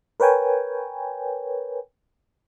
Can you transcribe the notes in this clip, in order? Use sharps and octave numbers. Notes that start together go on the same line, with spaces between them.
A#4 B4 C#5 G5 G#5